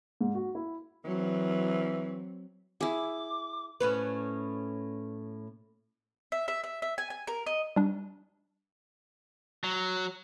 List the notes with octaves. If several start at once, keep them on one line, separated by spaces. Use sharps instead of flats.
G#2
F#4
E4
E3 F#3 C4
E4 G#4 D6
A2 C#4 B4
E5
E5
E5
E5
G#5
G#5
A#4
D#5
G3 D4
F#3